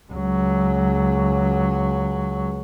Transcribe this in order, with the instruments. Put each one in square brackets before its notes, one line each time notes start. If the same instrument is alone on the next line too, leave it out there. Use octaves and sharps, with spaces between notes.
[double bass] C#2 F#3